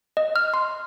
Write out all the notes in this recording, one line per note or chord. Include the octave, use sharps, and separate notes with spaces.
D#5
F6
C6